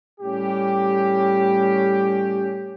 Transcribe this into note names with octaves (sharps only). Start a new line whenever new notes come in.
A2 G3 C#4 G4